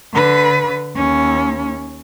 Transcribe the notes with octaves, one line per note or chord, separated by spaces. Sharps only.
D3 B4
D#2 C#4